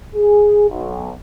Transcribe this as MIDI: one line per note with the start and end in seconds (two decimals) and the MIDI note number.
0.16 0.67 68
0.70 1.11 35